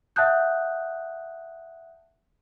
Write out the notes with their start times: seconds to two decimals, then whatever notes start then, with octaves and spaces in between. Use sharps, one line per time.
0.16 E5 F#5 A5 D#6 F#6 G6